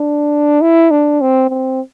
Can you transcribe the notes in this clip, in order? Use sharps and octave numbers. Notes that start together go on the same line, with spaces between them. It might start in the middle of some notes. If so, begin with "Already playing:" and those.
Already playing: D4
E4
D4
C4
C4